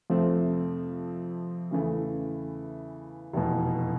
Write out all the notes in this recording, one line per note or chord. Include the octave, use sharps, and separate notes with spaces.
F2 C3 F3 A3 C4
E2 C#3 E3 A3
F1 E2 B2